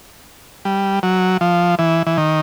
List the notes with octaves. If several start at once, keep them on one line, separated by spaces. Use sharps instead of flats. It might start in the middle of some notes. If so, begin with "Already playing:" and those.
G3
F#3
F3
E3
E3
D#3